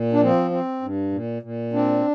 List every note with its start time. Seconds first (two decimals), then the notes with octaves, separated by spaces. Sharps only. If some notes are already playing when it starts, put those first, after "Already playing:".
Already playing: A#2
0.13 D4
0.21 F3 C4
0.51 C4
0.81 G2
1.12 A#2
1.42 A#2
1.73 C4 D4